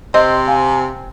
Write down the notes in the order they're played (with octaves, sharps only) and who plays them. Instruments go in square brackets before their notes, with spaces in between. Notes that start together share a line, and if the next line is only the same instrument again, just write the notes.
[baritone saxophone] C3 [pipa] C4 [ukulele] D#5
[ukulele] F5 [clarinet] G#5